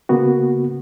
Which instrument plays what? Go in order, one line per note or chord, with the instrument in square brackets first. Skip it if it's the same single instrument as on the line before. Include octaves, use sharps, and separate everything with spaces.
[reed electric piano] C#3 A#3 B3 F#4